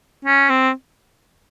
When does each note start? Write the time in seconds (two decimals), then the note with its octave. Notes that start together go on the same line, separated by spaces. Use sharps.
0.25 C#4
0.49 C4